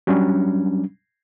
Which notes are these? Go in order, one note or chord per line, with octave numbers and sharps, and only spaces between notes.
F#3 G3 C#4 D4